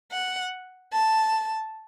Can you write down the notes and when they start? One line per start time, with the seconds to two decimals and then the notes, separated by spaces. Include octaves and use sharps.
0.12 F#5
0.93 A5